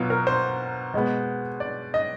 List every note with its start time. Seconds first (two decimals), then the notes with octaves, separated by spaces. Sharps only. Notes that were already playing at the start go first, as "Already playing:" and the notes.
Already playing: B2 F#3 B3 F4
0.10 A#4
0.27 C5
0.94 B2 G#3 B3
1.60 D5
1.94 D#5